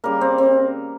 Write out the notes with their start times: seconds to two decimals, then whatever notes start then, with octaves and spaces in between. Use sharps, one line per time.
0.04 C#3 G3 A#3 A#4
0.21 C4
0.38 C4